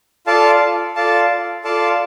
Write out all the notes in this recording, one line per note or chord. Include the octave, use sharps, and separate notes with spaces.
F4 A4 D5 F5 A5
F4 A4 D5 F5 A5
F4 A4 D5 F5 A5